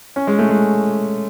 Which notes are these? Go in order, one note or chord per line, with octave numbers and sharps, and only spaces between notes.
C#4
G#3
A3
G#3